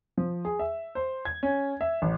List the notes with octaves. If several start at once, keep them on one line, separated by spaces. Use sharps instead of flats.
F3
G#4
E5
C5
G#6
C#4
E5
A1